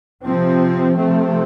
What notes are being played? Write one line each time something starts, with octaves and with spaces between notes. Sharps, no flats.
C3 F3 C4
C3 F3 A3 C4